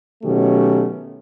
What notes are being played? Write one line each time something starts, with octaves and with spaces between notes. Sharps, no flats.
B2 D#3 F#3 A3 C#4 G4